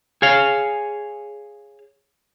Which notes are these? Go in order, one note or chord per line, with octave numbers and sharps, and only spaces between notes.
G#4 C#5 F5